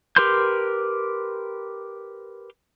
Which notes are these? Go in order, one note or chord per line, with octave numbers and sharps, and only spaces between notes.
G4 A#4 B4 C6 G6